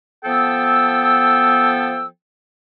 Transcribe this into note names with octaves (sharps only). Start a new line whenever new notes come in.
F3 B3 A4 G5 E6